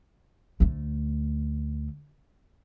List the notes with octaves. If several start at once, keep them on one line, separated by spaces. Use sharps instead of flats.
D2 A3